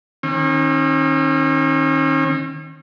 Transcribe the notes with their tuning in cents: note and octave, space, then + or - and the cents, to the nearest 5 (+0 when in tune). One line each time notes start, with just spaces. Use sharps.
D#3 +0 C#4 -45